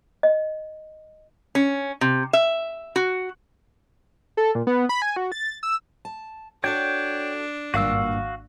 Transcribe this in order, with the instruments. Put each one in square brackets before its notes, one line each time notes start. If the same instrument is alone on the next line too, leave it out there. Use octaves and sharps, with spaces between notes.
[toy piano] D#5
[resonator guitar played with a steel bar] C#4
C3
E5
F#4
[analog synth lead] A4
A#2
B3
B5
G#5
F#4
A6
E6
[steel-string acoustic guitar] A5
[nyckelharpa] D4 [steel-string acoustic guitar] F#4 A4 D5 [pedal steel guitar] C#5 G5
[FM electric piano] G#1 [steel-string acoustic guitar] G2 A#2 A#3 [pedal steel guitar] F#4 F5 E6